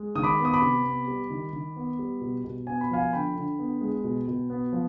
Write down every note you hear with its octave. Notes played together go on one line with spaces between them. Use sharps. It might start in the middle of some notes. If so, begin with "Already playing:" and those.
Already playing: G#3
D#3 D#6
B5 D6
B3
D#6
B5 D6
C3
B3
G3
D#3
D#3
B3
G3
B2
B2
B3 G#5
B5
F3 F5 G#5
D3 G5 B5
D3
B3
G#3
B2
B2
B3
F3